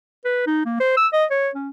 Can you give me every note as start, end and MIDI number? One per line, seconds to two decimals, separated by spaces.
0.25 0.47 71
0.47 0.62 63
0.65 0.79 58
0.80 0.93 72
0.97 1.07 88
1.13 1.25 75
1.30 1.50 73
1.55 1.70 61